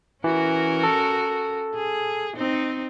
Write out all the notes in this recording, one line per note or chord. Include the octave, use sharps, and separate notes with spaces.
E3 C#4 F#4 A#4
A4
G#4
C4 D#4